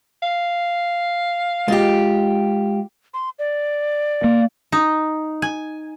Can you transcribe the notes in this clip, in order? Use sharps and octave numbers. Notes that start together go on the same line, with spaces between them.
F5
G#3 F4 G4 D#5
C6
D5
A#3
D#4
G#5